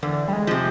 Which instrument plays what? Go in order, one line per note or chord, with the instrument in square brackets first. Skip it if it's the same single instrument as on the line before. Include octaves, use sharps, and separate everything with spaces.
[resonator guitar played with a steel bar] E2 [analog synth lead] D3
[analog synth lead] G3
G#3
[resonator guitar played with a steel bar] C3 F3